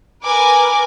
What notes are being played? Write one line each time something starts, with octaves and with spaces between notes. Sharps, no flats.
A#4 B4 G#5 D6